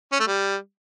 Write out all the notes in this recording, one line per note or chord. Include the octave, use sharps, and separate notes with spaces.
C#4
A3
G3